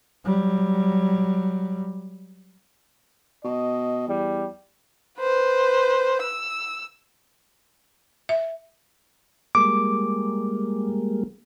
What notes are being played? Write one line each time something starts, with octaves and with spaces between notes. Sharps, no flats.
F#3 G3
B2 D#5
E2 G3
B4 C5
E6
E5
G3 G#3 A#3 D6